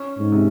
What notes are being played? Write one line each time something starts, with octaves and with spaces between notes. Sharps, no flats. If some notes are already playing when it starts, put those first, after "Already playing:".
Already playing: C#4
G#2
C3